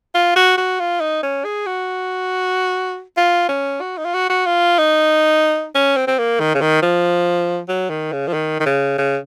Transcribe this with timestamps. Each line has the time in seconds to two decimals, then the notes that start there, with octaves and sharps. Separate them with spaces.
0.15 F4
0.36 F#4
0.58 F#4
0.79 F4
1.00 D#4
1.23 C#4
1.44 G#4
1.66 F#4
3.17 F4
3.49 C#4
3.81 F#4
3.98 D#4
4.05 F4
4.14 F#4
4.30 F#4
4.46 F4
4.78 D#4
5.75 C#4
5.97 C4
6.07 C4
6.18 A#3
6.40 D#3
6.54 C#3
6.61 D#3
6.82 F3
7.68 F#3
7.90 D#3
8.12 C#3
8.27 F3
8.33 D#3
8.60 D#3
8.66 C#3
8.98 C#3